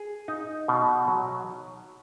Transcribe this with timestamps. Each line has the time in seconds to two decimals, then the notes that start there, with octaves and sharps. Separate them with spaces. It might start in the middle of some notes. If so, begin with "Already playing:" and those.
Already playing: G#4
0.28 D#4
0.68 B2
1.08 F#3